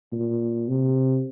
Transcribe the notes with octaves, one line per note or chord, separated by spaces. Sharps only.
A#2
C3